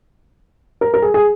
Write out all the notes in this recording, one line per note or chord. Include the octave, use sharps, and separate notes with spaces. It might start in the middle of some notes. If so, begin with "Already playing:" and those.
A#4
A#4
G#4
G#4